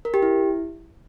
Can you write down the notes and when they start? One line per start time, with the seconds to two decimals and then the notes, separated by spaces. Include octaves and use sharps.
0.05 A#4
0.14 G4
0.22 E4